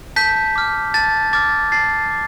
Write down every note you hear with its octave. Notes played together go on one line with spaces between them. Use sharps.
A5 G6 B6
D6 F6
A5 A6
D6 F6 A6
A5 A6 C7
D6